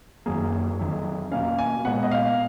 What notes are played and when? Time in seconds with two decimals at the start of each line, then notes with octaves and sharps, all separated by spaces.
0.26 F#2 D#3 F#3 A#3 G#4
0.79 F2 D#3 F#3
1.31 B2 A#3 C#4 F5
1.59 G#5
1.85 A#2 G#3 B3 F#5
2.03 D#5
2.11 F5